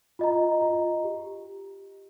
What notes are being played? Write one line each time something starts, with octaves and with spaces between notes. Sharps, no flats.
F4 D#5 A#5
F4 D#5 A#5
G4